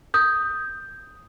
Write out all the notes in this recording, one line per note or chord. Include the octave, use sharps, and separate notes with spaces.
D#6 G6